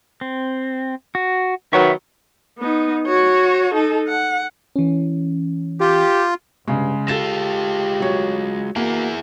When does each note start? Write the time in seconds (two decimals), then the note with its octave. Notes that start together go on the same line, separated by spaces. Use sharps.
0.21 C4
1.15 F#4
1.73 D#3 F#3 B3 E5 C#6
2.59 B3 D#4
3.07 F#4 C#5
3.74 D#4 A4
4.07 F#5
4.76 E3 C#4
5.81 F4 G4
6.68 G2 C#3 G#3
7.08 G#3 F4 G4 A4 A6 E7
8.00 F#3 C#5
8.76 A#3 E4 F#4 G#4